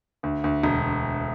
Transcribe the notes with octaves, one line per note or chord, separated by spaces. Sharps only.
D2
D2
E1